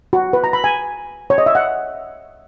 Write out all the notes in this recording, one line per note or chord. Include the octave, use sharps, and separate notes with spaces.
F#4
B4
A#5
B5
G#5
C#5
D#5
E5
F#5